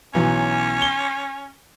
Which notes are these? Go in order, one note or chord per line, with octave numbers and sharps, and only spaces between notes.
B1 E3 F#3 C#4
G7